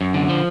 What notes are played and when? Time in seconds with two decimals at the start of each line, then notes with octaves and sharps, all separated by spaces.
0.01 F#2
0.14 D3
0.29 F3